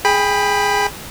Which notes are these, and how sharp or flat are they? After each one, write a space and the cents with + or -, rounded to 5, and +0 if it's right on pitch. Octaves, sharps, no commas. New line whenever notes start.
G#4 +0 G5 +25 B5 +0